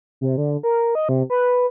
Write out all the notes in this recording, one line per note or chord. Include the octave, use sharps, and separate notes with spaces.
C3
D3
A#4
D#5
C3
B4